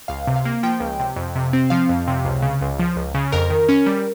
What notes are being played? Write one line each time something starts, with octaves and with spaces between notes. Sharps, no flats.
C#2 F5
C3
F5
A#3
F3 G5
C#2
C3
F2
C3
C4
F3 F5
F2
C3
C#2
C#3
C#2
F3
C#2
C#3
F2 A#4
D#3
C#4
G3